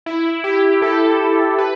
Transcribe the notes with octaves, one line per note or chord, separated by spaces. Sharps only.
E4
G4
A4
B4